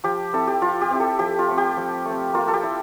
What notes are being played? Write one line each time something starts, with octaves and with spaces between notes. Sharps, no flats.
F3 G4
C4 E4 A4
G4
F3 F4
G4
C4 E4
A4
F3 G4
F4
A3 C4
G4
F3
A3 C4
A#3 F4
A4
G4
E4